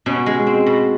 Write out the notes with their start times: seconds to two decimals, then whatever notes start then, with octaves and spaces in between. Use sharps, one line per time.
0.06 B2 C#4
0.26 G#3
0.47 C4
0.66 B2